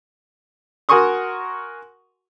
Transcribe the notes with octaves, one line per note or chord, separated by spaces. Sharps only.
F#4 A#4 G#5 C6 C#6 D#6